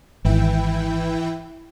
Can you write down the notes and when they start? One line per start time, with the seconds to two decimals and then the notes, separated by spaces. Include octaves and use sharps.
0.25 G#1 E3 E4 G5